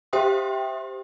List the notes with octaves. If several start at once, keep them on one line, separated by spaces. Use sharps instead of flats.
G4 C5 E5 G5 C6 D#6